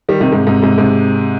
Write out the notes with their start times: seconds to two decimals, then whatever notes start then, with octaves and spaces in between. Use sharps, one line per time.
0.09 D#3 G3
0.20 C3 D#3
0.32 G#2 C3
0.47 G#2 C3
0.62 G#2 C3
0.78 G#2 C3